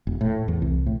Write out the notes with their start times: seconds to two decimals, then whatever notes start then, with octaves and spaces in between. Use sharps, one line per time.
0.07 E1
0.21 A2
0.48 E2
0.62 C2
0.86 A2